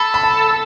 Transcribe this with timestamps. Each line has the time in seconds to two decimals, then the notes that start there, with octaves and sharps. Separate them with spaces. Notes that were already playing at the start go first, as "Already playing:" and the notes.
Already playing: A4 B5
0.14 B5
0.23 A5